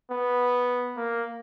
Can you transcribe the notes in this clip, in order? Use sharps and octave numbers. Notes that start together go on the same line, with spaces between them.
B3
A#3